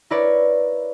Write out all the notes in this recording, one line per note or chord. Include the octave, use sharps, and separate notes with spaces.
E4 A#4 B4 C#5 D5